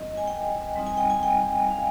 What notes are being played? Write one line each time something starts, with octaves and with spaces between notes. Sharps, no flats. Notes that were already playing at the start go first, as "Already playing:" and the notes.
Already playing: G3 C4 D#4 D#5
G#5
G5
G3 C4 D#4
G#5
G5
G#5
G5
G3 C4 D#4 F5